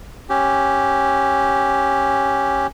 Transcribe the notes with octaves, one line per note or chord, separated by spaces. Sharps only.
C#4 G4